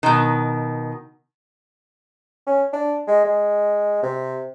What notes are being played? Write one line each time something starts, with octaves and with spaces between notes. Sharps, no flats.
B2 D#3
C#4
D4
G#3
G#3
C3